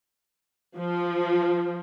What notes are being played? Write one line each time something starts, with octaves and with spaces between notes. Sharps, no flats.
F3